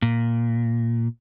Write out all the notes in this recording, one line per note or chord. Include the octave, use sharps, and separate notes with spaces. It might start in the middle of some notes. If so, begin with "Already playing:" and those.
A#2